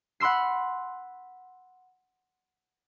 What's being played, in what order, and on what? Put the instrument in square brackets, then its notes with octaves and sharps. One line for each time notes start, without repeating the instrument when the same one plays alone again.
[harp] F#5 B5 C6 E6 C7